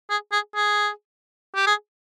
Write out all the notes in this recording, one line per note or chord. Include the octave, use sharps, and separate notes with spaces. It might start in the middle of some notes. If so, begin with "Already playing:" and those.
G#4
G#4
G#4
G4
G#4